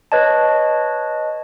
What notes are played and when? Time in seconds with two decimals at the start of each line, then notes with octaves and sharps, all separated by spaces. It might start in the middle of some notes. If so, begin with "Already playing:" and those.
0.12 B4 C#5 D#5 A5